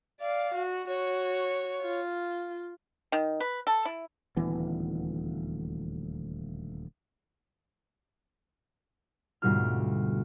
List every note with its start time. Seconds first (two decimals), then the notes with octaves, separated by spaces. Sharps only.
0.21 D5 F5
0.54 F#4
0.88 F#4 C#5
1.81 F4
3.12 D#3
3.40 B4
3.67 A4
3.85 E4
4.37 D#1 D2 E3 B3
9.42 D2 G#2 B2 G3 F4 F6